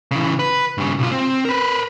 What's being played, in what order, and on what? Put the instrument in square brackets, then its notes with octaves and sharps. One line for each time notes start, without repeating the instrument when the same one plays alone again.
[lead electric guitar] C#3 E3
B4
G2 C#3
B1 F4
C4
A#4 B4